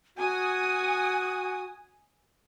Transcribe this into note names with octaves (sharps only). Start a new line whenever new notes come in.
F#4 G#5 D#6